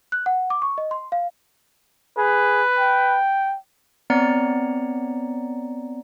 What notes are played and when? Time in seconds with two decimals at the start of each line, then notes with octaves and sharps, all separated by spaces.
0.12 F#6
0.26 F#5
0.50 D6
0.62 C#6
0.78 D#5
0.91 C6
1.12 F5
2.18 G#4 B4
2.79 G5
4.10 B3 C4 C#5 D5 A#5 C#7